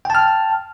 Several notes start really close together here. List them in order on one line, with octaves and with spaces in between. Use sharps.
G5 A5 F6